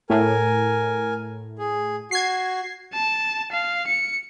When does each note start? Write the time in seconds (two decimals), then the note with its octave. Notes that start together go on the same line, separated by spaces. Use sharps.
0.10 A2 A#4 G#5
1.58 G#4
2.11 F#4 G#6 C7
2.93 A5
3.52 F5
3.87 C#7